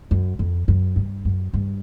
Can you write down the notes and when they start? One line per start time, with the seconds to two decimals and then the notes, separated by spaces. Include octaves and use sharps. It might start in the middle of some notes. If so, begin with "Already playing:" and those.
0.11 F#2
0.39 F2
0.68 F#2
0.96 G2
1.25 F#2
1.54 G2